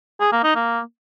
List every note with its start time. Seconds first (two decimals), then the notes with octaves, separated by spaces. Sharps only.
0.20 G#4
0.32 A#3
0.44 D#4
0.55 A#3